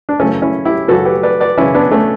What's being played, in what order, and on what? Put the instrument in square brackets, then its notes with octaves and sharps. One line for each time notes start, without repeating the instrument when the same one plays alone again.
[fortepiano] D4
F#2 C#3 E3 A3 C#4
C#4 E4
E4 G4
F#2 C#3 E3 F#4 A4
G4 B4
B4 D5
B4 D5
F#2 C#3 E3 C#4 E4
B3 D4
A3 C#4